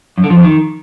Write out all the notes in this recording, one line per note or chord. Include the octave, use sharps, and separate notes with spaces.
F#2
D3
F3
F2
D#3